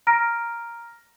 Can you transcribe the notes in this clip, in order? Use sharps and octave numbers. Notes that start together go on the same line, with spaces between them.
A#5 F6 A#6 D7